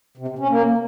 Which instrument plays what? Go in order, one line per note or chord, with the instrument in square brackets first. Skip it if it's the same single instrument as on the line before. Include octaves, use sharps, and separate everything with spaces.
[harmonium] C3
C3
C#4
A#3